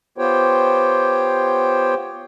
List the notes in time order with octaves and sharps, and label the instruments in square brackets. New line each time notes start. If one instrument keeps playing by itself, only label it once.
[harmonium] B3 F4 G4 C5 C#5 G5